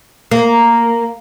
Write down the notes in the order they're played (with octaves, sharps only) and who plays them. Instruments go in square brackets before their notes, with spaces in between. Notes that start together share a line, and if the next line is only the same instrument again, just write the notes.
[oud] A#3